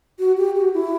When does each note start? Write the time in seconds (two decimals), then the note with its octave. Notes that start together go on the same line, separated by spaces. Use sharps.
0.19 F#4
0.37 G4
0.56 F#4
0.74 E4